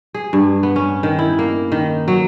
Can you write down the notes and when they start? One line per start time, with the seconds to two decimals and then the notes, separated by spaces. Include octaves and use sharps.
0.14 G#4
0.33 G2
0.63 B3
0.76 C#4
1.03 D#3
1.19 E4
1.39 A#3
1.72 D#3
2.08 F#3